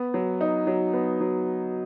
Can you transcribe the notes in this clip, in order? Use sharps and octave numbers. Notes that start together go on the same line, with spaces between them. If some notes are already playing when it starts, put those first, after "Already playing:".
Already playing: B3
F#3
D#4
F#3
B3
F#3